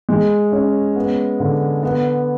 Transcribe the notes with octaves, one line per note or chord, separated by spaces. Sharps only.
G#3
C#4
B3
D3
B3